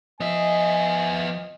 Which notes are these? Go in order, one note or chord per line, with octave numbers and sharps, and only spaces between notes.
F3 B3 D#5 E5 G#5 D#6